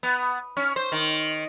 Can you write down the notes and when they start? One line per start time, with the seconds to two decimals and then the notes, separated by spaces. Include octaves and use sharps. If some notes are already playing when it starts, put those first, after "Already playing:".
0.03 B3
0.57 C#4
0.76 C5
0.92 D#3